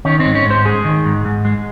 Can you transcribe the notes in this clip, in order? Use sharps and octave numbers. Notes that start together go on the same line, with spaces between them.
D#3 C#4
C4
G#2
C#4
G#2
C5
G#3 G#4
D#3
G#2
G#2
G#3